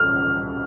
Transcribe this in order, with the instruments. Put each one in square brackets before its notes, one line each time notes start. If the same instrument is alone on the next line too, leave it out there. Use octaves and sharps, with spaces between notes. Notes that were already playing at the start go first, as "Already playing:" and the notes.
Already playing: [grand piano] F6